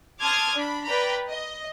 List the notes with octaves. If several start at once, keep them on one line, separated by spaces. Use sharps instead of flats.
A5 C6 D6 D#6 F6 G#6
D4 B5
B4 D5 G5 A#5 B5
D#5